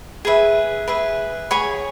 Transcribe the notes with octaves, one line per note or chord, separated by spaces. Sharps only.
G#4 B4 E5
G#4 B4 E5
G#4 C#5 G#5 B5